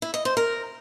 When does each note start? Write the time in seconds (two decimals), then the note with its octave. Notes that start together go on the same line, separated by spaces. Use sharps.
0.02 E4
0.14 D#5
0.25 C5
0.37 A#4